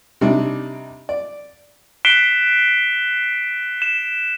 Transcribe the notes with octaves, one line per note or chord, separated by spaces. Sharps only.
C3 G3 D4 D#4
D5
F#6 B6 C7 D7 E7 G7
E7